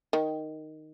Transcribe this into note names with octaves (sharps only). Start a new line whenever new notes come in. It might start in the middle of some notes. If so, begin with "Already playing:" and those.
D#3